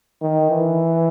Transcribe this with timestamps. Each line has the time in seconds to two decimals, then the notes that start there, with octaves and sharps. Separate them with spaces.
0.22 D#3
0.50 E3